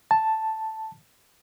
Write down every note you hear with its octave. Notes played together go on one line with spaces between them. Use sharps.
A5